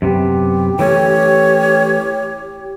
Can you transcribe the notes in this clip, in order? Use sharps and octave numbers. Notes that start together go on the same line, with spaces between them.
F#2 C3 B3 G4
E3 A3 C#4 C#5